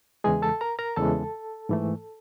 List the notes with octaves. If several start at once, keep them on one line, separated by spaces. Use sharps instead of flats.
E2 C#3 E3 G#3 G#4 G#5
A4 A5
A#4 A#5
A#4 A#5
E2 C#3 E3 G#3 A4 A5
G#2 E3 A3